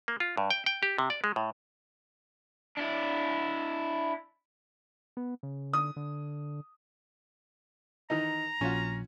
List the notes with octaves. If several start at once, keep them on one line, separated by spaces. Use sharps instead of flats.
A#3
F4
G2
G5
G5
G4
C3
D5
G#3
A2
D4 E4
B3
C#3
D3 D#6
D3
D#3 E3 D#4 A#5
A#1 C#4 F4 F#4